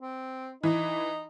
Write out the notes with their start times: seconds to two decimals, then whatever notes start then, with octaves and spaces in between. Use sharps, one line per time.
0.02 C4
0.63 E3 D#4